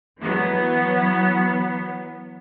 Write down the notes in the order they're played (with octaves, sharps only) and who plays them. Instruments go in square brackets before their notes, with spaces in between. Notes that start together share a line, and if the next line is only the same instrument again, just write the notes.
[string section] E3 F#3 B3